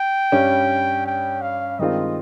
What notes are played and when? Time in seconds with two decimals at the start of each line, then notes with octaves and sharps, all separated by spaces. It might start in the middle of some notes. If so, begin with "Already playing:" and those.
Already playing: G5
0.32 G2 G3 C#4
1.06 G5
1.42 F5
1.79 G2 D#3 G#3 C4 F4 D#5